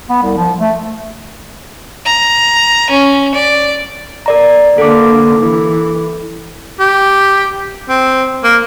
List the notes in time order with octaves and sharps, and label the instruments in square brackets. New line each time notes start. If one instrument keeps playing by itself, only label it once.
[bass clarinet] B3
C2
F3
A3
[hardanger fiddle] A#5
C#4
D5
[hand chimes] A#4 D5 A#5
[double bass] D3 A#3 [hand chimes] A4 D6
[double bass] E3
[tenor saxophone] G4
C4
A#3